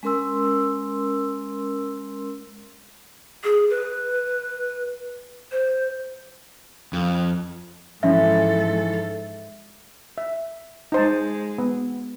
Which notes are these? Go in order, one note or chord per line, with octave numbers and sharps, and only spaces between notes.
G#3 C#4 A#4 C6 E6
G#4
B4
C5
F2
G#2 E3 F3 C#4 A4 E5
E5
G#3 D#4 C5 A5
B3